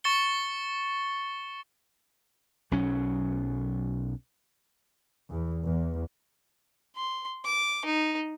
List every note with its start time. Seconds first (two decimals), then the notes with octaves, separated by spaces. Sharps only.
0.04 C#6 A6 C#7 G7
2.71 B1 F#3 C#4
5.30 E2
5.65 E2
6.96 C6
7.45 D6
7.85 D#4